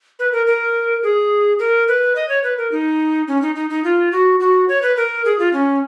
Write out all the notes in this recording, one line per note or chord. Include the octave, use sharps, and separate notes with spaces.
B4
A#4
A#4
G#4
A#4
B4
D#5
C#5
B4
A#4
D#4
C#4
D#4
D#4
D#4
F4
F#4
F#4
C#5
B4
A#4
G#4
F4
C#4